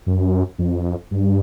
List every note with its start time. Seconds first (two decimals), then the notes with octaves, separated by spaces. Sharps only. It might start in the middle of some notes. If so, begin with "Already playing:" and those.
0.06 F#2
0.58 F2
1.11 G2